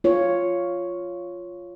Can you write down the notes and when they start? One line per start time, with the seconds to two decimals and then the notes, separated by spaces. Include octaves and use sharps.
0.04 F4 C#5